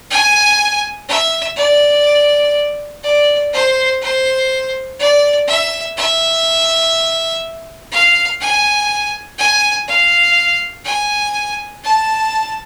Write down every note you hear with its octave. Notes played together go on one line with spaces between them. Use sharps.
G#5
E5
D5
D5
C5
C5
D5
E5
E5
F5
G#5
G#5
F5
G#5
A5